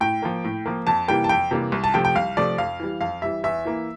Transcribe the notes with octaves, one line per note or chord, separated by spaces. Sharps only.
A2 G5
F3 A#3
A2
F3 A#3
F2 A5
C3 E3 G3 A#3 G5
A5
F2 G5
C3 E3 G3 A#3
C2
A5
C3 F3 A3 G5
G5
C2 F5
C3 F3 A3 D5
F2 F5
E3 G3
F2 F5
E3 G3 E5
E2 E5
E3 A#3